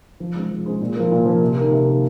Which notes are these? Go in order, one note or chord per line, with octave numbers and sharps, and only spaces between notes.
F3
G#3 C4
F3
G#3 C4
A#2
F3 A#3
A#2
F3 A#3
C3
D#3 A#3
C3
D#3 A#3